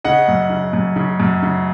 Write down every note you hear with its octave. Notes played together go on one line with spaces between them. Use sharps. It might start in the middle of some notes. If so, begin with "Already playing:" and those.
C#3 D#5 F#5
F#2
C#3
F#2
C#3
F#2
C#3